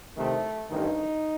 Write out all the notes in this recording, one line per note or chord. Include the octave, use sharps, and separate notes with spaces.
C2 C3 D#3 A3
A1 G2 D#3 D#4